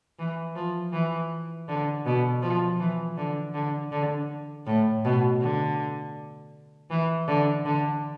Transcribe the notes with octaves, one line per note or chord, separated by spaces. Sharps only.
E3
F3
E3
D3
B2
F3
E3
D3
D3
D3
A2
B2
D3
E3
D3
D3